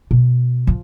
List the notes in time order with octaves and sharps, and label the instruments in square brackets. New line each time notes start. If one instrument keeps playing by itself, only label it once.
[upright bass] B2
F3